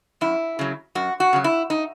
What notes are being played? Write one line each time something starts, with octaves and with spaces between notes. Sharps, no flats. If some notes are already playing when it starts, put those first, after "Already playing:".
F#2 E4
C#3 F#3
F#2 F#4
F#4
C#3 F#3
E4
D#4